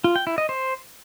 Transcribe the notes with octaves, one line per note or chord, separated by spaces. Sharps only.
F4
G5
E4
D#5
C5